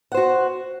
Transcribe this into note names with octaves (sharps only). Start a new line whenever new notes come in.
F#4 C5 F#5